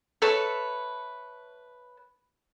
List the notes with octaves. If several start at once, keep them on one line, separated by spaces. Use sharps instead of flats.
A4 B4 C#5 E5